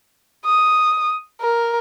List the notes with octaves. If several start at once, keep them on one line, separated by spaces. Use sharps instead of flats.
D#6
A#4